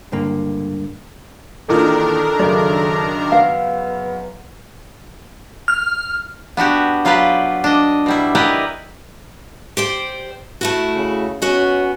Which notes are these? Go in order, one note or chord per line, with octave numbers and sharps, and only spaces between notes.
C#2 G2 D3 A#3
E2 A#2 D#3 D4 A4 A#4
F#2 C#3 D5
B3 F5
F6
B3 D4 F#4 G4
F#3 F4 G4 B4 D5
D4 D#5
B2 G3 E4
E4 G4 A#4 B4 D5 D#5
G4 C5 D5
A3 E4 F#4
C#3
B3 C#4 F#4 D#5